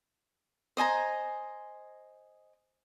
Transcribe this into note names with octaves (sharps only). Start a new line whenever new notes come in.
C5 D#5 G#5 A#5